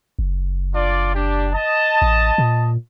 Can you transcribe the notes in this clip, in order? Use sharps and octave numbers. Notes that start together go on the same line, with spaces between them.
F#1
D4 F4 D5
D4 G4
D#5 A5
A1
A#2